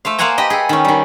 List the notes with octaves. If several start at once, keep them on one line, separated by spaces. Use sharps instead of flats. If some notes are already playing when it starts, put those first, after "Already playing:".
A3 C5 F5
A#3 C5 F5 F#5 G#5 A#5
G4 B4 D#5
G#4 A4
D#3 C#4
D#3 G3